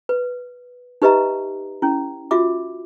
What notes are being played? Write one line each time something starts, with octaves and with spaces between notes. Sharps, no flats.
B4
D#4 G4 B4 D#5 E5 A#5
C#4 E4
F4 F#4 E5 D6